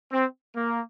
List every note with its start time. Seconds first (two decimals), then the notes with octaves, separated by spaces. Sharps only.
0.12 C4
0.55 A#3